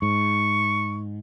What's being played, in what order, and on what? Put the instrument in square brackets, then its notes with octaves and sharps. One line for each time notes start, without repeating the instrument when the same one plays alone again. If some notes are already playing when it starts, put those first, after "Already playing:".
[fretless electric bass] G#2 [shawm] C#6